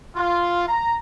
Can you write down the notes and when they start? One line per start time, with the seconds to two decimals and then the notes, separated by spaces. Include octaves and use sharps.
0.16 F4
0.69 A#5